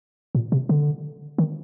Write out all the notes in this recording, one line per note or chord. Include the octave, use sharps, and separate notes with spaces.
A#2
C3
D3
D#3